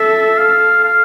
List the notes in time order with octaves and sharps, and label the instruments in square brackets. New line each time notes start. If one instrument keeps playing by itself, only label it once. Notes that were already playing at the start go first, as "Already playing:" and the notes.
Already playing: [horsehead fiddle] A4 [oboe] E5
[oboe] F5
F5